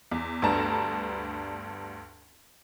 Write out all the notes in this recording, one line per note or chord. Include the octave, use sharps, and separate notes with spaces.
E2
D2 G2 B3 D4 A5 A#5